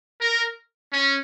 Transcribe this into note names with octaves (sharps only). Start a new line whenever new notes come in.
A#4
C#4